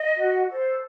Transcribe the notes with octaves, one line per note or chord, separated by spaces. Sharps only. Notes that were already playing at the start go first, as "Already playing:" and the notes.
Already playing: D#5
F#4
A4 C5